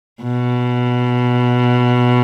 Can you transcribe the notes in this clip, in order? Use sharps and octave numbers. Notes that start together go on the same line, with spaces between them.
B2